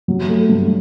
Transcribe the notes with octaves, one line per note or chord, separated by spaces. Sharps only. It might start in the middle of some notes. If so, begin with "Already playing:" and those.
F#3
A3
G2